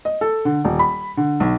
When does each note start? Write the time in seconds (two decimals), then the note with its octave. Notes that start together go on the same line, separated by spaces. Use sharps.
0.05 D#5
0.21 A4
0.45 D3
0.64 D#1
0.79 B5
1.17 D3
1.40 B1